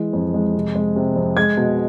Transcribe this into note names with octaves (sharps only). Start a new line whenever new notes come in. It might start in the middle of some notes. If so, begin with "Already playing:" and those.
Already playing: E3 G#3
F2
G#3
C3
G#3
C3
F2
G#3 G#6
B2